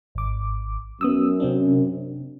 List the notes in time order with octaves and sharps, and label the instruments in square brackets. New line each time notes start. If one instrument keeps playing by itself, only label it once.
[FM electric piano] G#1 D6
[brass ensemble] F#2 [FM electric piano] B3 D#6 E6
[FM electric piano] C3 C4 D4